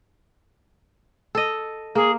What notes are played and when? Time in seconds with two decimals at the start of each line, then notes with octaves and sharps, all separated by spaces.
1.35 A4 D#5
1.95 A#3 G#4